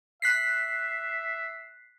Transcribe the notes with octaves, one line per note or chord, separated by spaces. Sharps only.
E5 F#6 B6 C7